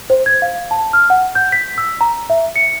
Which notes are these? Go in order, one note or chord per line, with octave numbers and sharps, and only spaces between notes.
C5
G#6
F5
A5
F6
F#5
G6
B6
E6
A#5
E5
C#7